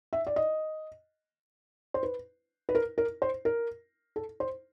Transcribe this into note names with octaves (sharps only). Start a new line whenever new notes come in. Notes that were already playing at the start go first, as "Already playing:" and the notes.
E5
D5
D#5
C5
B4
B4
A#4
A#4
C5
A#4
A4
C5